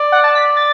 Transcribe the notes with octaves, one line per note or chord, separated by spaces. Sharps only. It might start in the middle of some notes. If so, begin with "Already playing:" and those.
Already playing: D5
F#5
A5
B6
A6